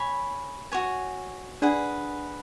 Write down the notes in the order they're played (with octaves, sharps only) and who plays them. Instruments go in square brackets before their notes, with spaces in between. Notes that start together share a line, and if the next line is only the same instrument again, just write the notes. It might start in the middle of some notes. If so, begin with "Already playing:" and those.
Already playing: [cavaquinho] C#5 G#5 B5
F#4 C#5 G#5
[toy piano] D4 D5 [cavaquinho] G#4 B4 F#5